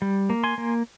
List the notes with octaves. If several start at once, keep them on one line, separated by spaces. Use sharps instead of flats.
G3
A#3
G#5 C6
A#3